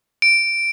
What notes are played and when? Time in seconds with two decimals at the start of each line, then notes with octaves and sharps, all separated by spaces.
0.22 D7